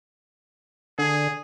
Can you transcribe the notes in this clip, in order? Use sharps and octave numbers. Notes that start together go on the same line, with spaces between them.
D3 G#4